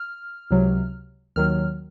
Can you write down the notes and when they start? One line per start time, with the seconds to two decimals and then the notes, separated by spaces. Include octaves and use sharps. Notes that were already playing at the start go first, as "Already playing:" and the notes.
Already playing: F6
0.51 C#2 C3 F#3
1.36 D#2 D#3 F#3 F6